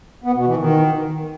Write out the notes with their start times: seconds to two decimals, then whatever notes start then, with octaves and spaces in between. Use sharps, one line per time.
0.24 B3
0.35 B2
0.47 E3
0.58 D#3